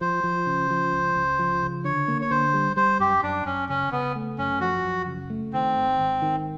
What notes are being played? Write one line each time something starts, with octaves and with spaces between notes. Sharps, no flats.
F3 C5
F3
C#3
F3
C#2
C#2
F3
C#3
D3 C#5
A#3
C#5
D3 C5
G3
G3 C5
F#2 G4
F#2 D4
F#2 C#4
C#3 C#4
C#3 B3
A3
F#2 C#4
F3 F#4
F#2
C#3
A3
D#3 C4
G#1
G#1
D#3